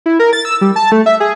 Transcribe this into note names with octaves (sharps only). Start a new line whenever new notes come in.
E4
A#4
A6
E6
G3
A5
A3
E5
G#4